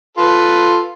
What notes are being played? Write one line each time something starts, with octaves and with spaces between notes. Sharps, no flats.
F4 A4 B4